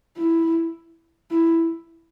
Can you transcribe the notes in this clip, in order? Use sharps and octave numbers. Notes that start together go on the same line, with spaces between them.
E4
E4